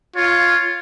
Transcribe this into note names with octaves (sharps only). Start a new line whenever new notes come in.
F4 C#5